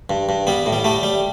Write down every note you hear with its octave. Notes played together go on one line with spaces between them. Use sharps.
G2
G2
G3 B3
A2
G3
G3 A3
G3